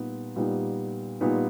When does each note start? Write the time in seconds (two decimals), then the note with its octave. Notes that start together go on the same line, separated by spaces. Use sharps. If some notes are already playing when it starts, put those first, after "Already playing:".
Already playing: A#2 G3 B3 D#4
0.36 A#2 G3 B3 D#4
1.21 A#2 G3 B3 D#4